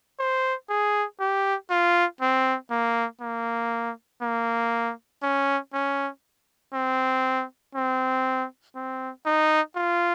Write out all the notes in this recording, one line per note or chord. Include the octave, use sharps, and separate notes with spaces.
C5
G#4
G4
F4
C4
A#3
A#3
A#3
C#4
C#4
C4
C4
C4
D#4
F4